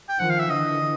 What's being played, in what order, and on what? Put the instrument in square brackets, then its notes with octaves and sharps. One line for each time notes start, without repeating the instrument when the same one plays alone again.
[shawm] G5
[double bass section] D#3 F3 [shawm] F#5
[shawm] F5
E5
[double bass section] D3 E3 [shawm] D#5